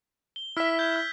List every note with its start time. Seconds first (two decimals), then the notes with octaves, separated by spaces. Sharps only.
0.36 G7
0.57 E4 E5 E6 F6 B6
0.79 G6 G#6 G7
0.96 F6